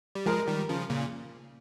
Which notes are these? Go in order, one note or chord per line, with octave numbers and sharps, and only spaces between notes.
G3
F3 G#3 A#4
D#3 G3
C#3 F3
A#2 C#3